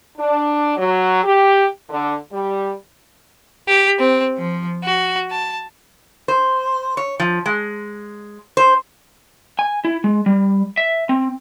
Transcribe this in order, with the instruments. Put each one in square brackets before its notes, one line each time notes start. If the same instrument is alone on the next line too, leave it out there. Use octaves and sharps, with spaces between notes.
[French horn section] D4
F#3
G4
D3
G3
[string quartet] G4
C4
F3
F#4
A5
[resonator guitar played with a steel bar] C5
C#5
F3
G#3
C5
[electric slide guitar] G#5
E4
G#3
G3
E5
C4